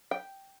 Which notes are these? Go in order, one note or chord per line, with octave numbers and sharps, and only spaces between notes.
G5